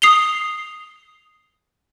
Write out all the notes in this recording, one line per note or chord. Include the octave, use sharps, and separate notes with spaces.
D#6 C7 F7 G7